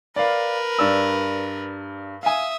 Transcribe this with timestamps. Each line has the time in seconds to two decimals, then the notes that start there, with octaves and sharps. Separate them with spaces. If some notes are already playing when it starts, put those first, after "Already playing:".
0.16 A#4 B4 D5 F5
0.79 G2 D5 E6
2.23 E5 F5 G#5 D#6